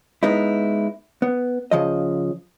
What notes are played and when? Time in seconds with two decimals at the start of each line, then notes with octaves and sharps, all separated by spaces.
0.23 G#3 B3 D#4 E4
1.22 B3
1.71 C#3 F3 D#5